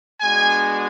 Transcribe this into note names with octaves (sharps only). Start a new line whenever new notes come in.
G#3 B3 D4 F#4 G#5